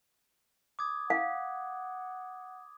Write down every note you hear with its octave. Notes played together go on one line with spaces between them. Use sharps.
D6 D#6 G#6
F5 F#5